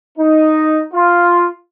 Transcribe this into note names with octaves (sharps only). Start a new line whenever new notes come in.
D#4
F4